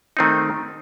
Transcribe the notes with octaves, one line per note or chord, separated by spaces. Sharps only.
D#3 A3 C4 D#4